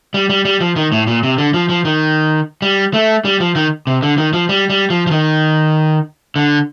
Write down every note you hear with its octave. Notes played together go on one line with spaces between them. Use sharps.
G3
G3
G3
F3
D#3
A2
A#2
C3
D3
F3
F3
D#3
G3
A3
G3
F3
D#3
C3
D3
D#3
F3
G3
G3
F3
F3
D#3
D3